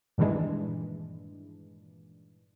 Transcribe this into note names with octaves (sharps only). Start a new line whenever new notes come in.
G2 A#2 D#3 E3 G#3 D4